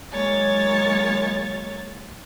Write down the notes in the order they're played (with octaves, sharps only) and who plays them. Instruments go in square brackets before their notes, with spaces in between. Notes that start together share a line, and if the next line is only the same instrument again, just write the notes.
[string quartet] D#3 F#3 G#3 A#3 C#5 A6